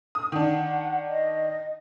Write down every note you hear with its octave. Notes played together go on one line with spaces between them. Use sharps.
D#6
D#3 D4 F#5
D#5